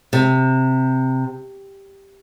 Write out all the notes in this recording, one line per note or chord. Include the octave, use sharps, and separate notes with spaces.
C3